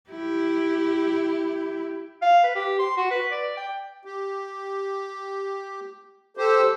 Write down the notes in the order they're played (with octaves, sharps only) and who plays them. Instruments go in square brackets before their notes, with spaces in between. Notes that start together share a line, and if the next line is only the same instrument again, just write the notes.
[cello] E4 G4
[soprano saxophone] F5
B4
G4
C6
F#4
B4
D5
G5
[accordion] G4
[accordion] G4 C5 [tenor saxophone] A4